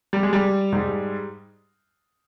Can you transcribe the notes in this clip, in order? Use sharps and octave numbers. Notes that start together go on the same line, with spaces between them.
G3
G#3
G3
G#2 G3